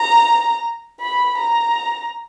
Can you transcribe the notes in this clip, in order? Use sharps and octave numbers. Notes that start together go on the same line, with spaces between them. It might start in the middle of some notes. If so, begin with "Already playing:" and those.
Already playing: A#5
B5
A#5